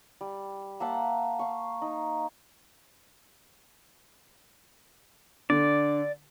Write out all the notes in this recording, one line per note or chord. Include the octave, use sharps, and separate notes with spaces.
G3
A#3 E5 F#5 A5
F5 C#6
D#4
D3 D5